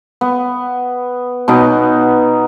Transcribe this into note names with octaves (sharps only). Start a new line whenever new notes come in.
B3
B2 B3 D#4